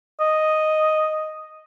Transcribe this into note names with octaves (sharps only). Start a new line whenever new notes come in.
D#5